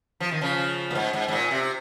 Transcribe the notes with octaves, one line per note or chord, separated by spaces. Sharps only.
F3
D#3
C#3 F3
A#2
G#2
G#2
G#2
A#2
C3